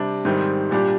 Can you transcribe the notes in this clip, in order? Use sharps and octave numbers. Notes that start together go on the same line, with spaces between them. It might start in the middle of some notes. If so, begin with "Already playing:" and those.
Already playing: C3 G3 D4
G#2 D#3 G3 C4
A#2 G3 D4 G4